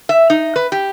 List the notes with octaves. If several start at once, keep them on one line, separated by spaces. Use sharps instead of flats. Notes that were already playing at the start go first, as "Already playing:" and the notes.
E5
D#4
B4
G4